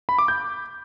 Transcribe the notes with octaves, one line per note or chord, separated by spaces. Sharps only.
B5
D6
G6